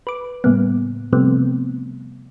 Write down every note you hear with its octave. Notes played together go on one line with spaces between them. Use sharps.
B4 D6
A2 C#3 G3 A#3 B3
C3 F3 G3 A3 B3 C4